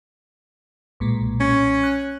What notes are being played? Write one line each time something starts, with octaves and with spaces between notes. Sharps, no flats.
B1 A#2 G#3
C#4
F#6